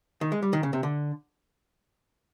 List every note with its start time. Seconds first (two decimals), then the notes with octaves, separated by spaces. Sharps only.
0.21 D#3
0.32 G#3
0.42 G3
0.53 D#3
0.63 C#3
0.73 C3
0.83 D3